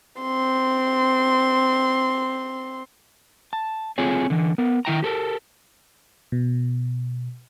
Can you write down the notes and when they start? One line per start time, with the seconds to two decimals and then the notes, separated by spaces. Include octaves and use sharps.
0.22 C4 C6
3.53 A5
3.98 C4 F4 G#4 A4 C#5
4.30 D3 E3
4.58 B3 A#4
4.85 D#3 E4 G5 A#5
5.03 G4 A4 A#4
6.32 B2